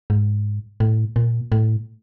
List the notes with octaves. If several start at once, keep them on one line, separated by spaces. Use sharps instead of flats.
G#2
A2
A#2
A2